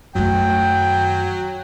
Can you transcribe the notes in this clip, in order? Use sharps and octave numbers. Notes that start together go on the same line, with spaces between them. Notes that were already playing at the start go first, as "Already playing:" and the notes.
F#2 D#3 F#3 A3 G5